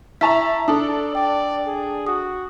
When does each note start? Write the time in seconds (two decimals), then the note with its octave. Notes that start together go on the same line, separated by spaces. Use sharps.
0.21 E4 E5 A5 A#5 C#6 B6
0.68 D4 A4 D5 D#6
1.15 D5 G5
1.66 G#4
2.07 F#4 D#6